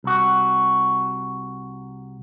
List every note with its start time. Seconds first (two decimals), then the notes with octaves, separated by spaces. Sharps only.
0.04 C2 F#4